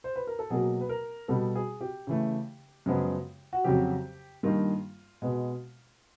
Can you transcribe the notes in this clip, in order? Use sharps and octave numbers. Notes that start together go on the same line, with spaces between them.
C5
B4
A#4
A4
B2 F#3 A#3 G#4
B4
A#4
B2 G3 B3 A4
G#4
G4
C#3 E3 A3
F#2 C#3 F3 G#3 B3
F#4
F2 C#3 F#3 G4
G2 D#3 G3 A#3 F4
B2 G#3 B3